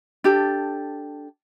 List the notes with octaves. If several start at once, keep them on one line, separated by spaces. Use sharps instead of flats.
D4 G4 A4